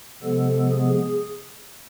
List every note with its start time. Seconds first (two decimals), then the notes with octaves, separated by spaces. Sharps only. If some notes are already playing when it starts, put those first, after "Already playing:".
0.22 C3 F3 G#3 B3 A4
0.72 G#4